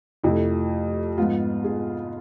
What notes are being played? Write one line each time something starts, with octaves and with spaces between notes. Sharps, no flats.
F2 C3 F3 A3 E4
G#2 F3 B3 F4
G#4